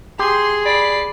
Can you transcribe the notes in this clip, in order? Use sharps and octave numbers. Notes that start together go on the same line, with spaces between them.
G4 G#4 C6
D5 B5 C7